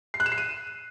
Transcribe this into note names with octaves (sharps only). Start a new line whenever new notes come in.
C7
F#6
E7
C7
D#7